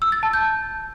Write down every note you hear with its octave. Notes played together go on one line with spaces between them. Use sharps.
E6
A6
A5
G6